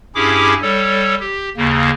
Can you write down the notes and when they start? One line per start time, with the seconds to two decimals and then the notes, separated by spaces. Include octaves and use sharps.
0.15 G2 C#4 E4 G4 G#4 D6
0.62 G3 A4 C#5
1.20 G4
1.57 D#2 C#3 A#3